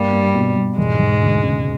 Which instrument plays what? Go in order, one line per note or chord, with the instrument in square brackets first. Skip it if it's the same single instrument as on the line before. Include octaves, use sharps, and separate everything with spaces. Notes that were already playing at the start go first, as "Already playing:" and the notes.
Already playing: [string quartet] G2 G3 [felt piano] A#3
[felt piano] A#3
B2
G3
[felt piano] E1 [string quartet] G#2 G#3
[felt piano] E1
D2
C#3